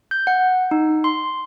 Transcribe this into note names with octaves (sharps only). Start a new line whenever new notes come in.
G6
F#5
D#4
C6